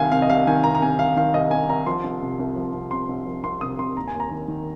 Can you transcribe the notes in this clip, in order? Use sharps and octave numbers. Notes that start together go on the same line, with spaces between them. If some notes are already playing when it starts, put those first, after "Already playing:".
Already playing: C2 D#3 F5 G#5
C3 F5
D#5
C2 F5
D#3 G#5
C2 A#5
A#5
C3 G#5
C2 F5
D#3 F5
C2 D#5
C3 G#5
C2 A#5
F3 C6
C2
C3
C2
F3
C2
C3 C6
C2
F3
C2 C6
C3 D#6
C2 C6
D#2 A#5
G#5
D#2
A#5
D#3
D#3